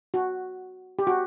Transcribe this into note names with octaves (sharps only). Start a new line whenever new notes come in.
F#4
G4
F#4